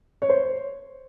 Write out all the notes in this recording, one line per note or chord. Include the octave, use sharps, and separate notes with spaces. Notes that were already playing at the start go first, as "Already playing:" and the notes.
C#5
C5